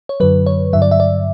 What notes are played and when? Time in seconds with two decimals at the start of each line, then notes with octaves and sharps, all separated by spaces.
0.09 C#5
0.20 F#2 D3 F#3 B4
0.46 C#5
0.73 G2 D3 F#3 E5
0.82 D5
0.91 E5
1.00 D5